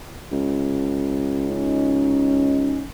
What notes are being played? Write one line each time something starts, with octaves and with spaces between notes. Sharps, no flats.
C#2
C#4 D#4